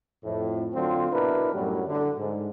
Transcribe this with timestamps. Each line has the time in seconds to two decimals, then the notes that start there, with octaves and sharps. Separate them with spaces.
0.24 F2 A2
0.73 D3 F#3 C4 F4 C5
1.12 B2 D4 E4 A#4 B4
1.53 F#2 A2 F#3 G3
1.88 D3
2.18 G#2